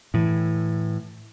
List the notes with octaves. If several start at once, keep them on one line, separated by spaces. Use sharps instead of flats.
A2 E3